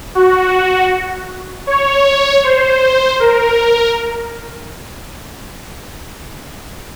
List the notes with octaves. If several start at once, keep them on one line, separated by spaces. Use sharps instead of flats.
F#4
C#5
C5
A#4